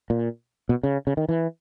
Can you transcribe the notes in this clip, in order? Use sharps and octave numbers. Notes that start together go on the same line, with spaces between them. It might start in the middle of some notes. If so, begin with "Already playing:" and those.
A#2
B2
C#3
C#3
D#3
E3